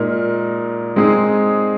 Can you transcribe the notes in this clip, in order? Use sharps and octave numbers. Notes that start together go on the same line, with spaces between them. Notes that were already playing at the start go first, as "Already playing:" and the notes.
Already playing: A#2 G#3 D#4 A#4
G#3 C4 D#4 G#4